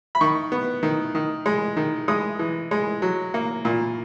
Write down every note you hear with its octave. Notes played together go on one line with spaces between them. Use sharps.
B5
D#3 C#6
B3
D#3
D#3
G#3
D#3
G#3 D#6
E3
G#3
F#3
A#3
A#2